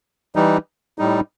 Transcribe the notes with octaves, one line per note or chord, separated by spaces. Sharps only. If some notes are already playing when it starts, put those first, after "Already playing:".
E3 G3 D#4
A2 G3 D#4